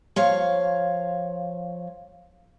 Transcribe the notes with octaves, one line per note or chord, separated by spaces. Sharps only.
F3 C#5 F5